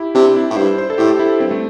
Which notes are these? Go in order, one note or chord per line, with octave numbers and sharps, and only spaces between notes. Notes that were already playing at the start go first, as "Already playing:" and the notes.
Already playing: E4 G4
C3 D4
E4
A2
G2 C5
C5
A4
A2 G4
E4
G2 C4
A3